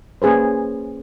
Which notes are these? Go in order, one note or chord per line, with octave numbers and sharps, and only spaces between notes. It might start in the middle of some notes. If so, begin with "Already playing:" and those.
A#3 C#4 G#4 B4 C5